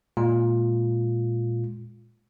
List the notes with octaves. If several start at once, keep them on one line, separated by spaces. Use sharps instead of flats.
A#2 G#3 F4